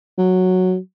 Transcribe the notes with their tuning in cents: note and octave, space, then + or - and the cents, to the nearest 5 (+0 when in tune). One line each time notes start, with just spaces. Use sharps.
F#3 -5